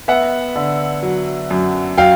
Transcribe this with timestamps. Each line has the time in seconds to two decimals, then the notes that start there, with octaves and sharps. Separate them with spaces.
0.08 B3 E5 F#5
0.56 D3
1.03 F#3
1.51 F#2
1.97 F#3 F5 G5